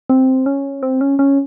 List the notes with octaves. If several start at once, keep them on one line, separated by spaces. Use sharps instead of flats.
C4
C#4
C4
C#4
C#4